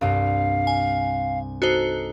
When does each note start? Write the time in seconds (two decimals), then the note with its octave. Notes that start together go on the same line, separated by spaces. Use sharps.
0.01 C2 G2 F5
0.67 G#5
1.62 D#4 F#4 A4 C5